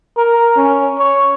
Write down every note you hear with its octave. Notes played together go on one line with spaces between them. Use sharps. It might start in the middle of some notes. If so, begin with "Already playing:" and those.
A#4
C#4
C#5